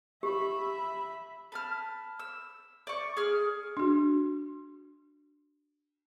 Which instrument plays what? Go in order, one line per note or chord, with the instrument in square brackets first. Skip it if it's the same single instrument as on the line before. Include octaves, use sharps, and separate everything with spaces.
[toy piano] G4 [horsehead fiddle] E5 B5
[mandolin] B4 A5 F6
E6
D5 C#6
G#4 F6
[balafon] D4 F#4